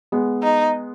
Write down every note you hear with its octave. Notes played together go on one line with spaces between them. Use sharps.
G#3 B3
D#4